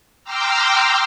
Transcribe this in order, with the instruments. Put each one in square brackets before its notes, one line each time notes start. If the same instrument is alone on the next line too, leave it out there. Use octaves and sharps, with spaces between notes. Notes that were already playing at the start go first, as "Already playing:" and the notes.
[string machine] G5 A#5 C6 D6 E6 F6